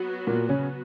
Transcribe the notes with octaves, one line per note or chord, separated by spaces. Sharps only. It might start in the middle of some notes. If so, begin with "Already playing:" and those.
Already playing: F#3 B3 F#4
A#2 A#3
C#3 C#4